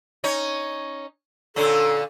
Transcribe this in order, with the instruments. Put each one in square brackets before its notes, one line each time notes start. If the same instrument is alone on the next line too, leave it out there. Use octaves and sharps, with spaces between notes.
[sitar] C#4 D#4 C#5
[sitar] A#2 D3 C#4 [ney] A4